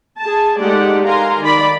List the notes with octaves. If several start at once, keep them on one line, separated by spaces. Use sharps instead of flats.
G#4 A5
G#3 A3 D#4 G4 D5 F#5
A#4 F5 G#5 A#5 C6
D#3 D5 B5